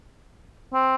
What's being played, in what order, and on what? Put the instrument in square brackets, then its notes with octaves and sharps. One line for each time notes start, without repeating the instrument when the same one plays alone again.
[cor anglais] C4